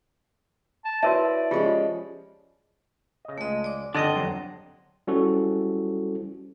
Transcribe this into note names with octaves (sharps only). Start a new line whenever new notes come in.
A5
E4 F#4 A#4 B4 C#5 D5 E5 A5
F3 G#3 C#4 F4 G4 G#4 A5
C#3 D#5
C#2 G#3 A3 D#5
D5 D6
G1 D3 C4 D4 D5 D#5 F#5 G5
G1 F2 F#3
G3 C#4 E4 F#4 A4 C5